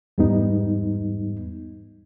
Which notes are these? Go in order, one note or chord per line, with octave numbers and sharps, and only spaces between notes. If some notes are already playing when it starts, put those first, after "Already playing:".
E2 G#2 G3 B3 D#4